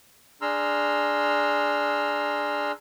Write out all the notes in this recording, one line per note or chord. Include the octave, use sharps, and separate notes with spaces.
D4 G#4 A#5 C6 E6 F6